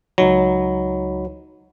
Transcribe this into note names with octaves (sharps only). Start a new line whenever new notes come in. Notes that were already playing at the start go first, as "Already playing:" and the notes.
C#2 F#3 D#4 B5